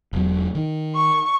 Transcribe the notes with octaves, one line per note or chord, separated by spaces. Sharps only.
E1 F#3
D#3
C#6